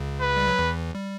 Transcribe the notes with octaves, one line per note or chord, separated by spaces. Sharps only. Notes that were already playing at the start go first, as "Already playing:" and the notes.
Already playing: C#2 C#3
B4
G3
F#3
E2 E3
G3